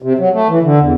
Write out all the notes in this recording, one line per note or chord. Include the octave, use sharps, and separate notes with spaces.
C3
F#3
A3
E3
D3
E2